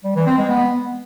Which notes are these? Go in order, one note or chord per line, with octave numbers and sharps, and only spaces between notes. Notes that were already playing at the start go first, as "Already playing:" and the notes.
G3
E3
C4
G#3
B3